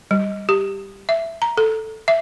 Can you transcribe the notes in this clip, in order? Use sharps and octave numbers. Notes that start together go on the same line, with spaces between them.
G3
G4
E5
A#5
A4
E5